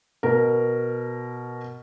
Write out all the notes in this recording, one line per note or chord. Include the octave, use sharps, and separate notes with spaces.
B2 A#4